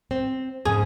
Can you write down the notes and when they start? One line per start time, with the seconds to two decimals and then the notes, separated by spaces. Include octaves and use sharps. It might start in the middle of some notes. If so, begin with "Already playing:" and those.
0.11 C4
0.65 F2 G#2 C#3 G#4